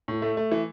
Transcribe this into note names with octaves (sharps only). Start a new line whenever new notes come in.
A2
A3
A3
E3